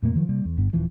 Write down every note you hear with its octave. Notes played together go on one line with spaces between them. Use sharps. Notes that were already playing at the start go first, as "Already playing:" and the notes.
F2 A#2 A3 A#3
D#3 F3 F#3
C3 G3 A#3
E2
G1 G2 B3
D#1 E3 F3